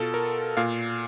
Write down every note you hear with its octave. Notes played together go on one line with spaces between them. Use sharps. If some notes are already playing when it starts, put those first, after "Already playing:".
Already playing: B2 F4 A4
A#4
A#2 F5